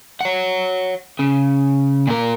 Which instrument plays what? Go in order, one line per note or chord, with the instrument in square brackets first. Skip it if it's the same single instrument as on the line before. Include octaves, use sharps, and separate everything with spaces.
[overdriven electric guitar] C#5 F#5
C#3
A#2 A#4